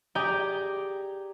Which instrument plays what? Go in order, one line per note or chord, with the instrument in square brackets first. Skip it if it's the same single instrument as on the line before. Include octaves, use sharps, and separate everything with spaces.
[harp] G4 G#4 D5 G5 A#5